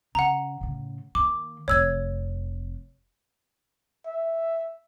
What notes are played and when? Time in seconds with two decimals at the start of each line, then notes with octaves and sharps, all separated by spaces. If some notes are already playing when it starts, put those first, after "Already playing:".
0.15 C#3 F#5 A#5
0.61 A2 C#3
1.15 D#3 A#3 D6
1.68 F1 F2 C#5 E6 G#6
4.06 E5